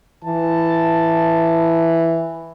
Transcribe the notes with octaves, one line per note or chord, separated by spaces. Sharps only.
E3 A5